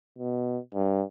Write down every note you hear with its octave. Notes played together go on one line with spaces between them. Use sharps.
B2
G2